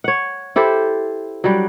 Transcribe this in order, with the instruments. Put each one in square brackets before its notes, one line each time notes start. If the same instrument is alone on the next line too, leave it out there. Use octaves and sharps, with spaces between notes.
[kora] C#5 F#5
E4 G4 A4 C5
F#3 G3 D4